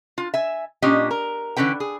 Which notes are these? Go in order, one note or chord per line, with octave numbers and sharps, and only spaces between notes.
F4
E5 G#5
A#2 C#4 D4 G4 D#5
A#4
D3 E3 C#4 B4 G5
G#4